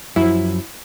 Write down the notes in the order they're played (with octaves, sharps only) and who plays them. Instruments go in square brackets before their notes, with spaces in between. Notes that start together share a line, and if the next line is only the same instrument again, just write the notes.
[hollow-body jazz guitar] F#2 F3 [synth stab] E4